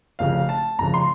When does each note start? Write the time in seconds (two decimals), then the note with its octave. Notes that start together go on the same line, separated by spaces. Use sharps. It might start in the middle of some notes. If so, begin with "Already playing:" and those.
0.19 F1 F2 C#3 F5
0.49 A5
0.78 F1 F2 C#3 A#5
0.94 C6